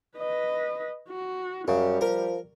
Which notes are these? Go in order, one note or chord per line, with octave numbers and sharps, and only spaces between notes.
B4 D#5
F#4
F#2 C#3 G3
F3 A#4